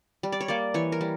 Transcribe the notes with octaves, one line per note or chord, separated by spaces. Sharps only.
G3
D5
C#5
A#3 D5
E3 C#5
A#4
G3